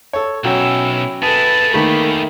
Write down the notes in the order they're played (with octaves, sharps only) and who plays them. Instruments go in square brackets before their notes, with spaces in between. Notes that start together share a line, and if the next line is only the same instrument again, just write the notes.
[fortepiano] A4 C#5
[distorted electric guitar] B1 [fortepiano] F#3 G5 [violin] C#4 E6 [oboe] E4
[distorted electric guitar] E4 G#4 [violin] A4 B4 [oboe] A5
[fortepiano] D#3 A3 [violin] A#3 [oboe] B5